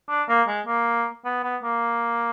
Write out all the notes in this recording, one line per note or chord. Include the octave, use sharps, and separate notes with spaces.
D4
A#3
G#3
A#3
B3
B3
A#3